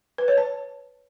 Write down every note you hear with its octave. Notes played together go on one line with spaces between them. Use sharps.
B4
C#5
A5